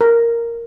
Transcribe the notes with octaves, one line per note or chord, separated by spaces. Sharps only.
A#4